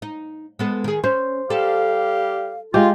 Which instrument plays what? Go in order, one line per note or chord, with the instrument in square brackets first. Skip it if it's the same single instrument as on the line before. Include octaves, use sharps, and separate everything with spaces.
[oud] D#4
G#3 B3 A4
D#3 G#4
[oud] C#4 [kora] C5
[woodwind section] G3 G4 F5 [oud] A4
[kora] G#3 G4 [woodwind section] F4